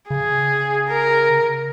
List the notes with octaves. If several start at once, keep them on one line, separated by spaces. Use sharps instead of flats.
C#3 G#4
A#4